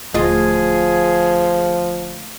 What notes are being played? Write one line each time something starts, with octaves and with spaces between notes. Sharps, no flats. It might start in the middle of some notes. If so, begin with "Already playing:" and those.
D#1 D2 F3 F4 G#4 D#5